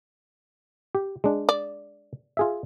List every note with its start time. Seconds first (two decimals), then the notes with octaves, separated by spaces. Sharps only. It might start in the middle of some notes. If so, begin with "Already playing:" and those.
0.95 G4
1.24 G#3 D4
1.49 D5
2.37 F4 G#4 E5